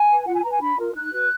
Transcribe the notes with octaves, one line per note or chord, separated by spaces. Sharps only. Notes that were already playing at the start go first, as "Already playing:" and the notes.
Already playing: G#5
B4
F4 F#5
G#5
B4 A#5
G#5
D4 B5
F4 A#4
D#4 F#6
F#4 B4